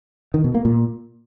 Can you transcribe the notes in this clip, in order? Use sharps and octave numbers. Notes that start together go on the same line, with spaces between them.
D#3
B2
A#3
A#2